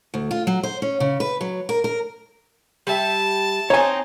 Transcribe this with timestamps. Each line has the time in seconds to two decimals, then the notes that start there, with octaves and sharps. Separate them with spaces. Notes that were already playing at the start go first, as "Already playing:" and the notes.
0.14 D2
0.31 F4
0.47 F#3
0.63 C5
0.82 C#4
1.00 C#3
1.20 B4
1.41 F#3
1.69 A#4
1.84 A#4
2.87 G3 E5 A5
3.70 C4 D#4 C#5 G#5